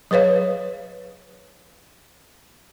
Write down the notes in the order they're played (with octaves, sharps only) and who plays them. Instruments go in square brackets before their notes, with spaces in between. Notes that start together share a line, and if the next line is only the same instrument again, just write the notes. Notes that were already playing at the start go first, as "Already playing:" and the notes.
[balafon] F#3 G#4 B4 C#5 F5